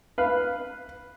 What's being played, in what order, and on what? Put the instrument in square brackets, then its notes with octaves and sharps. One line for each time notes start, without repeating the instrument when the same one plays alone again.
[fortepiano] B4 F5